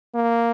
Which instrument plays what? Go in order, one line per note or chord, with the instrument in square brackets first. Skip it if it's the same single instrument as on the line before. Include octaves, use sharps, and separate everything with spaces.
[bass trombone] A#3